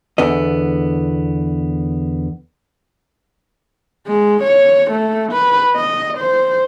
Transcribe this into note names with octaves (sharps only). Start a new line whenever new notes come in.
E2 D3 B3 D#5
G#3
C#5
A3
B4
D#5
C5